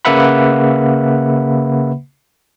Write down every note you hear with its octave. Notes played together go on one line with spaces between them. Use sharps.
C#3 A#3 B4 E5 F#5 B5